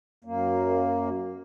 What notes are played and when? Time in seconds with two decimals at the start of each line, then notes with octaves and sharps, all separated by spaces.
0.25 F#2 A#3